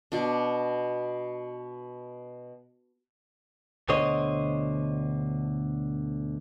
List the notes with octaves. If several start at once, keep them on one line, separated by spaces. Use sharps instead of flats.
B2 D4
D2 B2 D3 C5 C#5 D#5